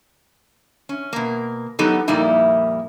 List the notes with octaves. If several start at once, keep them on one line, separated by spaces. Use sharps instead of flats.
C#4
B2 A#3
F#3 B3 D#4 F#4 G4 A4
F2 A#2 G3 A#3 D#4 E4